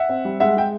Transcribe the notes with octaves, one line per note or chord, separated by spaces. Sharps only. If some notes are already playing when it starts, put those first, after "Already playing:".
Already playing: E5 F#5
C4
G3
G#3 E5 F#5
G#3 G5